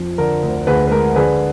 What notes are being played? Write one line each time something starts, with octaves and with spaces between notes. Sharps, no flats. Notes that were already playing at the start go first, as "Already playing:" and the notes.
Already playing: F2 F3
D3 A#4
D2
D2 G#4 B4
B4
G#3 A#4
D3 G#4 B4